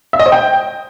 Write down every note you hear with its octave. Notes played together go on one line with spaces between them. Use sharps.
E5
D#5
C5
G5